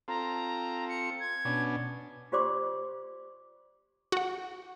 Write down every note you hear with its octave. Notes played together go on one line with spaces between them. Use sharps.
C4 F4 A4 A#5
C#7
G#6
B2 C#4 D4
F4 G4 C5 D5 C6 D6
F#4 F#5